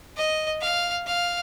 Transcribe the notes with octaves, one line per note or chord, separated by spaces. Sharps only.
D#5
F5
F5